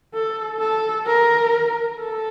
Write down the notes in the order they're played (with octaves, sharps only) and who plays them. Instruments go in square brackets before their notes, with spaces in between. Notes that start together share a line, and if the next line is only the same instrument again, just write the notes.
[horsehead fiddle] A4
A4
A#4
A4